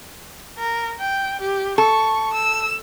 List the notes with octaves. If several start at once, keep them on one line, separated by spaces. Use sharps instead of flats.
A#4
G5
G4
A4 C#6
E6